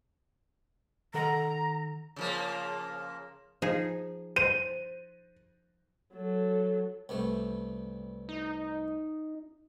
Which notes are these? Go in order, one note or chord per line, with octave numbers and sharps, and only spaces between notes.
D#3 A4 F#5 A#5
C#3 F3 A#3
F3 D#4 G#4
C5 D#7
F#3 A4
C2 G2 A3
D#4